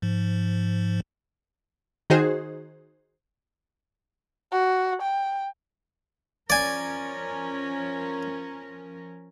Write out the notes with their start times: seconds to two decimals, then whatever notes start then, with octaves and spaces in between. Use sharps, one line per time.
0.02 G#2 F3
2.10 D#3 D#4 F#4 G#4 C5
4.52 F#4
5.02 G5
6.50 F3 C#4 A#4 D5 G#5